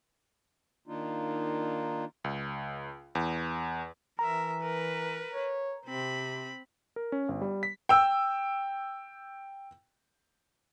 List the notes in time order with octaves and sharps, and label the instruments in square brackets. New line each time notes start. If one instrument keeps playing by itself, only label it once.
[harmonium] D#3 A#3 D4 D#4 F4
[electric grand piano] C#2
E2
[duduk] E3 [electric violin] A#4 E5 [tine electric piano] A#5
[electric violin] A#4 B4
[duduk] C#5
[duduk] C3 [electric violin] C4 B5
[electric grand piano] A#4
C#4
G1
G3
B6
[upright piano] G5 E6